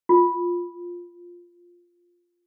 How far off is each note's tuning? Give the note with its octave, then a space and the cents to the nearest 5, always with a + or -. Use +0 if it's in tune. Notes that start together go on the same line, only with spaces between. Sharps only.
F4 +5